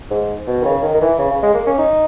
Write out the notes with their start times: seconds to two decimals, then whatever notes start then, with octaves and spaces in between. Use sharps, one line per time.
0.11 G#2
0.47 B2
0.62 D#3
0.65 C#3
0.82 D#3
0.94 D#3
1.01 E3
1.19 C#3
1.31 C#3
1.43 G#3
1.54 A#3
1.67 C#4
1.78 D#4